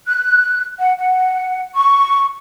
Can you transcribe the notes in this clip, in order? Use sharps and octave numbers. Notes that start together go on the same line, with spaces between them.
F#6
F#5
F#5
C#6